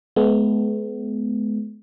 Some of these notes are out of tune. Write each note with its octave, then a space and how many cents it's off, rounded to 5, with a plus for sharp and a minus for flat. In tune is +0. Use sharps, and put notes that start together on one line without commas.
G#3 +45 B3 +20